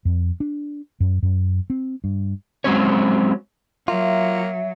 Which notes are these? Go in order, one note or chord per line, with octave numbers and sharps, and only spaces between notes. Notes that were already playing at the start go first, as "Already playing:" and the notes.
F2
D4
F#2
F#2
C4
G2
F#3 G#3 C4 C#4 C#5
F#3 A#3 F4 E5